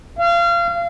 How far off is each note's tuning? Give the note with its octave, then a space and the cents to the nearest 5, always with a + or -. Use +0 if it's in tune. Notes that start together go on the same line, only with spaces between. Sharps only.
F5 -30